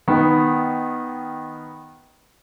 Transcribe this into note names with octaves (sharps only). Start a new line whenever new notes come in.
D#3 B3